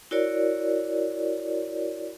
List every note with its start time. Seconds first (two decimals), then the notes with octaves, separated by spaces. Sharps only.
0.11 E4 F#4 A#4 C#5 D5